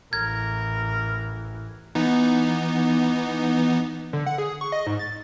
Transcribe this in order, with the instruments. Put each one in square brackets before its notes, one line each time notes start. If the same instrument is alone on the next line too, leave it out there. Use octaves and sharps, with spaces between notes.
[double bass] A1 E3 [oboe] A#4 [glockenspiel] G#6
[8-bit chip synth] E3 B3 D#4
[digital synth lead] D3
F#5
G#4
C#6
D#5
G#2
A6